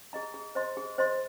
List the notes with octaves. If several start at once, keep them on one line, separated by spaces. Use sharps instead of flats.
G#4 D#5 A#5
G#4
C5 D#5 C6
G#4
C5 D#5 C6